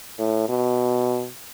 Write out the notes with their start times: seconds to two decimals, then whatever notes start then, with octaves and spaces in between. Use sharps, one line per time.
0.19 A2
0.49 B2